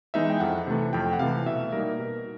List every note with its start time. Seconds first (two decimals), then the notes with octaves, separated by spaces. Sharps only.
0.14 E3 G#3 B3 D#4 E5
0.30 G5
0.40 F2 F#5
0.67 C3 E3 A3
0.93 F2 G5
1.13 F#5
1.19 C3 E3 A3 F5
1.46 B2 E5
1.72 G3 A#3 D#4 A#4
1.99 B2